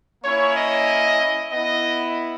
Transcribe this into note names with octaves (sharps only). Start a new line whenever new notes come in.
A#3 C#4 E4 C#5
D#5
B3 E4 D#5